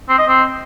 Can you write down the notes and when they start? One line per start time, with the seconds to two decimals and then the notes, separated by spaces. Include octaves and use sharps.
0.09 C4
0.18 D#5
0.28 C4